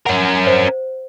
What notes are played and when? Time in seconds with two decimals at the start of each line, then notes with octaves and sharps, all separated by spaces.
0.06 C#4 A#4 F#5
0.47 C5